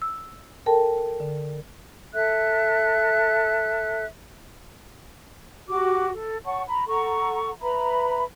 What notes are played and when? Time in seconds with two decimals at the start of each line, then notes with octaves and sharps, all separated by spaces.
0.02 E6
0.66 A4 A#4 G5 A5
1.20 D3
2.13 A4 E5 F#6
5.69 F#4 G4 D6
6.13 A4
6.45 C#5 F#5 A5 C#6
6.68 A#5 B5
6.88 A4 F#5 A#5 C#6
7.61 B4 E5 A#5 B5